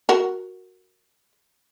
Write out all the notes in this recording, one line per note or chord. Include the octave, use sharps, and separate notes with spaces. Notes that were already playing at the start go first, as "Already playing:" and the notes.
F#4 A#4